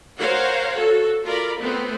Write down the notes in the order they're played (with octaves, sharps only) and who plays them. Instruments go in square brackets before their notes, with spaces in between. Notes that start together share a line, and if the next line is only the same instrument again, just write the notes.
[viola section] A#4 C5 C#5 F5 F#5
F#4 A4
F4 A#4 D5 B5
A3 B3 C4